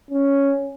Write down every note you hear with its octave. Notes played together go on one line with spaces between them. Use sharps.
C#4